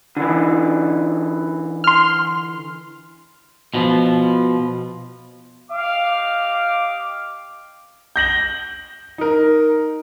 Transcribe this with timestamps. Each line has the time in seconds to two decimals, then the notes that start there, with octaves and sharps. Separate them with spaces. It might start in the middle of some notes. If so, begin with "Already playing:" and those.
0.17 D3 E3
1.84 C6 F6
3.74 B2 F3
5.71 G4 D#5 F5 D6
8.16 G6 A#6 F#7 G7
9.18 D#4 A#4